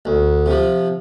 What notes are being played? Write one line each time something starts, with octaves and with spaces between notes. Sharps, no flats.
D2
C3 F3